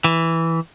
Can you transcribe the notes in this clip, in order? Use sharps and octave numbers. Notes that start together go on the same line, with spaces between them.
E3